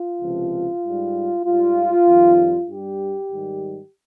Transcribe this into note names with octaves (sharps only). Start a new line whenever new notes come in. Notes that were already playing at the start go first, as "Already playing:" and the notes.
Already playing: F4
C#2 C3 F3
G#2 G3
G#2 G3 F4
F2 D#3 G3
G2 G3 G4
G#2 D#3 G3